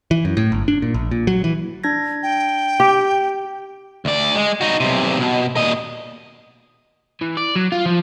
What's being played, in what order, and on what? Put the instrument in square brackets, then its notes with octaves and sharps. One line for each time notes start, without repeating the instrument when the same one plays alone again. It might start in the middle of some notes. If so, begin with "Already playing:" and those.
[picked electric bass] E3
F#2
A2
G1
D4
A#2
A#1
A#2
F#3
E3
[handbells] D4 G#6 A#6
[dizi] G5
[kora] G4
[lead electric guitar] D2 D5
G#3
D#4 F#4
B1 C3
B2
A#2 D#5
[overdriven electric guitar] E3
D5
F#3
F4
F3